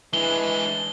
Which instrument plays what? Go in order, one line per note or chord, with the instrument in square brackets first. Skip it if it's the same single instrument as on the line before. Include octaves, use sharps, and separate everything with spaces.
[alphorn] E3 [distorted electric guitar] G#3 D4 [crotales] G7